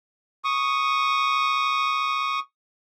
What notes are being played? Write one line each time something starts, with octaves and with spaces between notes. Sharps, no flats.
C#6 D#6